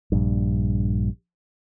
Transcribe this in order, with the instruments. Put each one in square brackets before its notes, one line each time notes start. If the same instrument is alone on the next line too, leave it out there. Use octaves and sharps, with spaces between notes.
[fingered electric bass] A#1 G2